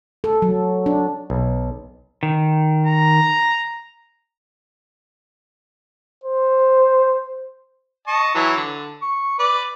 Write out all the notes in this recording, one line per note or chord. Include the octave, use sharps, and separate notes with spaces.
A4
F#3
D4
B1
D#3
A#5
C5
D#5 A5 C#6
E3 F#3
D3
C#6
B4 D5